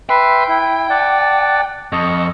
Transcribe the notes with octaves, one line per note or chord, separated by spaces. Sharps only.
B4 E5 G5 C6
E4
D5 F#5 A5
F2 D#5 C#6